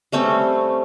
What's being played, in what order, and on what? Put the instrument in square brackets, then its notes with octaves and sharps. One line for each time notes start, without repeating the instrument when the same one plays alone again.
[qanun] G3 A3 C4 C#4